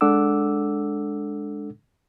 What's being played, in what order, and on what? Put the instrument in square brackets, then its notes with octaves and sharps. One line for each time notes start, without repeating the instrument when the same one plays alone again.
[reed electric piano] G#3 D4 A4 F#5 D6 E6